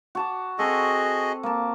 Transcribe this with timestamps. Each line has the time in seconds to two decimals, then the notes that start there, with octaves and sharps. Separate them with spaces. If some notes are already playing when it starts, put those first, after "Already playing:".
0.15 F#4 A5 D6
0.59 C4 F#4 G#4 A4 D#5
1.43 A#3 A5